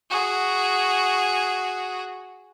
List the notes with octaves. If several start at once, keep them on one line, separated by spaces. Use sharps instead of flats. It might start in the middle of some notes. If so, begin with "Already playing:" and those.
F#4 G#4